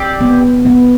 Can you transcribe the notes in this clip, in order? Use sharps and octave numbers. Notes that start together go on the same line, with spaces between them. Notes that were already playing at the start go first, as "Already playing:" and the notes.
Already playing: C4 G4 D5
B3
B3